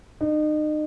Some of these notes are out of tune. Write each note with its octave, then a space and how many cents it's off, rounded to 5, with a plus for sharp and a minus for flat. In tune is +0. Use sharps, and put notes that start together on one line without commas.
D#4 -35